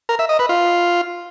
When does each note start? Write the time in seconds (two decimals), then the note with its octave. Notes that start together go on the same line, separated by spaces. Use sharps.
0.09 A#4
0.19 E5
0.29 D#5
0.39 B4
0.49 F4